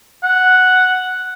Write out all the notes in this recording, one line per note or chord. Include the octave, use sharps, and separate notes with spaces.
F#5